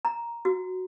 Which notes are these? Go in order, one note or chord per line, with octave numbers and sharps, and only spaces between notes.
A#5
F#4